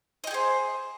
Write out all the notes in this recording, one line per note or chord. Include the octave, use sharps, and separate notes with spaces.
G4 G#4 C5 D#5